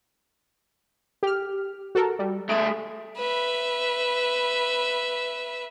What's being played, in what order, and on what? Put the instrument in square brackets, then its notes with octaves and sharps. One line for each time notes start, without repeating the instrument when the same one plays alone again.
[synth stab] G4 F6
F#4 A4 A#4
G3
[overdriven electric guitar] A3 G#4 [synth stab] D7
[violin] B4 E5